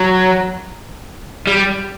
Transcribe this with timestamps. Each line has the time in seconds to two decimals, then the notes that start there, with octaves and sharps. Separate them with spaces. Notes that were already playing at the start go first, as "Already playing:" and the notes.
Already playing: F#3
1.47 G3